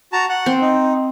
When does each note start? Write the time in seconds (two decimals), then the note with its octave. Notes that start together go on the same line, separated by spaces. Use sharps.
0.13 F#4 A5 A#5
0.29 F#5
0.46 C4
0.61 D#4